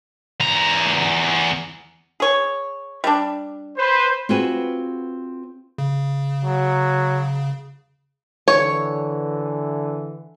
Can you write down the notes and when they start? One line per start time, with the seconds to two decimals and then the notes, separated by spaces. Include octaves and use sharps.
0.40 E2 A#5
2.20 G#4 C#5
3.04 G3 D4
3.78 B4 C5
4.29 C4 F4 F#4 G#4 B4
5.78 C#3
6.45 F#3
8.48 D3 E3 C#5